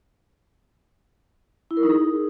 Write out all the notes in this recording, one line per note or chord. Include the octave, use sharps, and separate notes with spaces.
E4
A#4
D#4
G#4